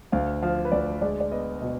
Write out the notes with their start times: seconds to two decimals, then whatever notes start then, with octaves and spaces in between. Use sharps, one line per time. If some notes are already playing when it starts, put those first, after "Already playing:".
0.12 D2 F5
0.42 F3 F5
0.65 B4
0.72 D2 D5
1.02 G#3 D5
1.20 D5
1.31 B3 D#5
1.61 B2 D#5